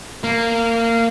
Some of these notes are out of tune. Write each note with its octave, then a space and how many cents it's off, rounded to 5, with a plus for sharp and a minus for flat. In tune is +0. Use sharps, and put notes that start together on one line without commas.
A#3 -20